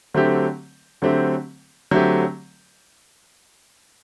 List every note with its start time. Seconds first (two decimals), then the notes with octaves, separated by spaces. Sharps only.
0.14 D3 F#3 A3 C4 G4
1.02 D3 F#3 A3 C4 G4
1.91 D3 F#3 A3 C4 G4